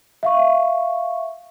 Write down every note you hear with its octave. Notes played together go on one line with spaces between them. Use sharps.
E5 F5 C#6